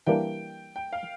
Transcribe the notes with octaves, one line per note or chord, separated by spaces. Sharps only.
E3 G3 A#3 D4 G5
G5
F5